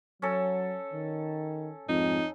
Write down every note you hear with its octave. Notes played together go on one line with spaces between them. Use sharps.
F#3 C#4 A4
D#3
F2 G#2 D#4